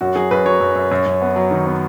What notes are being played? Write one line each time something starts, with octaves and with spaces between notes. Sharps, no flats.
F#2 F#4
F#3 G#4
F#2 B4
F#3 C#5
F#2
F#2
F#2
F#2
B3
F#3
D#3
B3